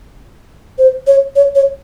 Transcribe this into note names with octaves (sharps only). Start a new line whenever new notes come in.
C5
C#5
C#5
C#5